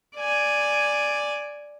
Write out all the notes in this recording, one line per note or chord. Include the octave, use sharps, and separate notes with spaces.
D5 G#5